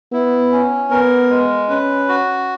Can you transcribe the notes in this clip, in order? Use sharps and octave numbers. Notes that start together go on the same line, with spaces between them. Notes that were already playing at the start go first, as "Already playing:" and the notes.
B3 E4
C#4
B3 A#4
G#3
C#4 B4
F#4